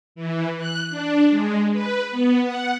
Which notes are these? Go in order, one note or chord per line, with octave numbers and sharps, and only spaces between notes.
E3
F#6
D4
G#3
B4
B3
F#5